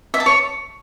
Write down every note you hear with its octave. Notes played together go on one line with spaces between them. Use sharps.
E5
A5
C#5